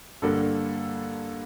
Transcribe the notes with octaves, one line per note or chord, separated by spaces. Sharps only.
G2 D3 G3 A#3 A4